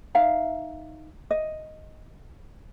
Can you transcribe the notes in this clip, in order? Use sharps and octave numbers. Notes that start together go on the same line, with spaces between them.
D#4 E5 F5 A#5
D#5